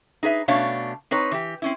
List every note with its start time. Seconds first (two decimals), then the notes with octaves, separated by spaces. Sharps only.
0.23 D#4 G#4 B4 E5
0.48 B2 A3 C#4 D4 C#5 F5
1.11 C4 D#4 B4 C#5
1.31 E3 G4
1.62 C4 C#4 E4